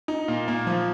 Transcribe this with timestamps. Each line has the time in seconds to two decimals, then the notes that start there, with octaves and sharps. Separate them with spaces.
0.08 D#4
0.28 A#2
0.48 A#3
0.67 F3